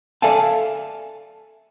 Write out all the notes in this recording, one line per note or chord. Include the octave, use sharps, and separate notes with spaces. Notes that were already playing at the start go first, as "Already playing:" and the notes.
A4 D5 E5 F5 G#5 A5